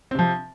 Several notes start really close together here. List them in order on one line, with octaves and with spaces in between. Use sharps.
C4 C3 F3